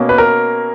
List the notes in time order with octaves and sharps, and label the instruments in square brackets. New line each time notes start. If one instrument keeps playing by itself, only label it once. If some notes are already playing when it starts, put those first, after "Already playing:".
Already playing: [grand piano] B2 A#3 C#4
B4
A#4